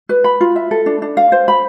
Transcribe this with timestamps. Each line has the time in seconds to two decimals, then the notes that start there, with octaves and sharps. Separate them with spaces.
0.09 B4
0.24 B5
0.41 F4
0.56 E5
0.71 A4
0.86 D4
1.02 D4
1.17 F5
1.32 C5
1.48 B5